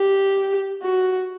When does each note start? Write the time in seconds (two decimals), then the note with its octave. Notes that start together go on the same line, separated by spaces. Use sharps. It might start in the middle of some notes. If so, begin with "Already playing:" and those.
Already playing: G4
0.82 F#4